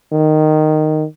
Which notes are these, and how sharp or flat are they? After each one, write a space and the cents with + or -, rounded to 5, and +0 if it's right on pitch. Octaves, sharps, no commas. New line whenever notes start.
D#3 -10